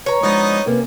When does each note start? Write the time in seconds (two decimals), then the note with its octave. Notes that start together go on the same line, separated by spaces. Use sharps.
0.06 B4 C#5 A#5
0.23 F3 G#3 B3 D4 D#4 D#5
0.66 C3 A#3 C#4 B4